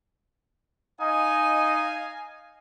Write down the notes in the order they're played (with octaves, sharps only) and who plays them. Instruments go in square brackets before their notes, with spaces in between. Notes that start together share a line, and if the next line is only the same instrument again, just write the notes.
[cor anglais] D#4 [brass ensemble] D#5 F5 G#5